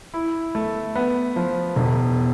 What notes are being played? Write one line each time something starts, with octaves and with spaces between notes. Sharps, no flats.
E4
A3
B3
F3
E1